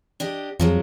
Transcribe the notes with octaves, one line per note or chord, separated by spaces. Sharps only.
D4 G4 D#5
F2 F3 F#3 G#3